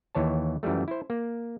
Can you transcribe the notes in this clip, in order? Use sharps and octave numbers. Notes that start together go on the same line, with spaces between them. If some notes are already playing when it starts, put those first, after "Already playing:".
D#2 E3 C#5 A5
F#2 E3 F3 G3 A3
E4 C5
A#3